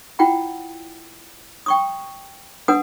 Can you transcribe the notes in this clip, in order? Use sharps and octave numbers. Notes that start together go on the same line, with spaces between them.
E4 F4 F#5 G5 A#5
G5 C#6 D#6
D4 B4 F#5 G#5 D#6